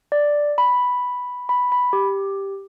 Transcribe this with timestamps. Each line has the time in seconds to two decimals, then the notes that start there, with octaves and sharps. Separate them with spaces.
0.12 D5
0.58 B5
1.49 B5
1.72 B5
1.93 G4